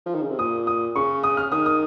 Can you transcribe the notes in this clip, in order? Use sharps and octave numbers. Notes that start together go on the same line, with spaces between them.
F3
D#3
C#3
C3
A#2 D#6
D#6
C#3 C#6
D#6
F6
D#3 D#6
D#6